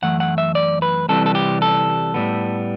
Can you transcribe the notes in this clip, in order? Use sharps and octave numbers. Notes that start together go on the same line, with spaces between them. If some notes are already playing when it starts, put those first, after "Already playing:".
F#2 E3 A3 F#5
F#5
E5
D5
B4
C2 C3 E3 G3 A4
A4
G4
A4
A2 G3 B3